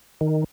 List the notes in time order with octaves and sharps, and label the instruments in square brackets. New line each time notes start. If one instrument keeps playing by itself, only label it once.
[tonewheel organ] D#3